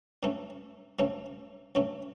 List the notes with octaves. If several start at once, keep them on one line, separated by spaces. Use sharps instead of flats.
G2 F#3 A3 C#4
G2 F#3 A3 C#4
G2 F#3 A3 C#4